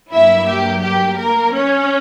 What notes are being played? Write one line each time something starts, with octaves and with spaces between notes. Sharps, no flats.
G2 F#3 A#3 E4 E5
G4
G4
A#3 A#4
C#4 C#5